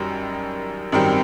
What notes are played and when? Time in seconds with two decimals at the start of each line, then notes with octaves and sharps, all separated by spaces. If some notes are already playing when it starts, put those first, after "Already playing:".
Already playing: F#2 D#3 G3
0.92 G#1 F#2 D#3 G3 C4